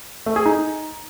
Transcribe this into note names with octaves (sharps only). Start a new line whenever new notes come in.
A3
G#4
D#4